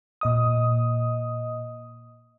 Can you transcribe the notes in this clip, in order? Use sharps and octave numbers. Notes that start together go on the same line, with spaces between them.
A#2 D#5 D#6